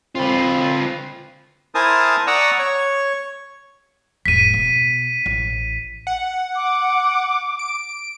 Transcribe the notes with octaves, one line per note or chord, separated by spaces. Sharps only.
C4 F4 B4
E4 A#4 C5 G#5 A5 D#6
D5 F#5 A#5 C#6 D#6 E6
C#5
E1 G#2 B6 D#7
B2
A1
F#5
D6
D7